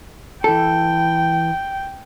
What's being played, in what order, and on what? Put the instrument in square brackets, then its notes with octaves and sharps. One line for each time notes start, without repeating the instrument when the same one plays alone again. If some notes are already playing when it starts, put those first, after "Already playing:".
[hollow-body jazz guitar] E3 A4 [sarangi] G5